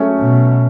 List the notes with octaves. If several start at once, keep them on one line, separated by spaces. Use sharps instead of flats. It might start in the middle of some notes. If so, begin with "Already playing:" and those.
Already playing: F#3 A3 C#4 G#4
B2